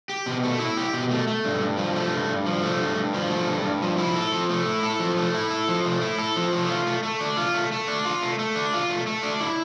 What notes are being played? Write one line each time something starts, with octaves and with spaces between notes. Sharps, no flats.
G4
B2
A3
E4
G4
B2
A3
A3
G2
G2
F3
A3
G2
G2
F3
A3
G2
G2
F3
A3
G2
G2
F3
E4
A4
F3
A3
E4
A4
F3
A3
E4
A4
F3
A3
E4
A4
F3
A3
F4
A3
A3
D4
F4
A3
A3
D4
F4
A3
A3
D4
F4
A3
A3
D4
E4